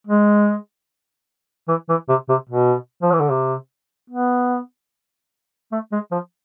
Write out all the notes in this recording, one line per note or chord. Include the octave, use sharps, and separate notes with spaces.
G#3
E3
E3
C3
C3
B2
F3
E3
D3
C3
B3
A3
G#3
F3